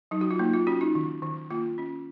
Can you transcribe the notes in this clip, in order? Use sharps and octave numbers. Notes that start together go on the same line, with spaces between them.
F#3 D#4
F#4
F4
A#3 D#4
F4
C#4 F#4
D#4
D#3
D#3
A#3 F4
C#4